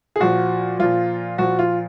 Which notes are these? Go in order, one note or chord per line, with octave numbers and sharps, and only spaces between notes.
G#4
A#2 F3 F#4
A#2 F3 F4
A#2 F3 F#4
F4